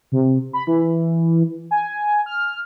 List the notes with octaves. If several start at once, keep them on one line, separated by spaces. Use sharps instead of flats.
C3
B5
E3
G#5
F6